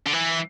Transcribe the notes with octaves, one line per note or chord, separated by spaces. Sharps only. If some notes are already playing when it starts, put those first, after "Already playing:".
D3
E3